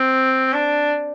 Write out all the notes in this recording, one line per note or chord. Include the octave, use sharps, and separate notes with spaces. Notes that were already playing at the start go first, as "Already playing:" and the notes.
Already playing: C4
D4